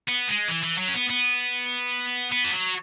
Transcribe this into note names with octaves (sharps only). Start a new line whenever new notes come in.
B3
G#3
E3
E3
F#3
C#4
B3
B3
B3
E3
F#3